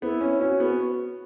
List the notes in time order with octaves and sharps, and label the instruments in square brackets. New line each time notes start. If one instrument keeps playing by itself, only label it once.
[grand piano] B3 [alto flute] E4
[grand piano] C#4
[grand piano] C#4 [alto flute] F#4
[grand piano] B3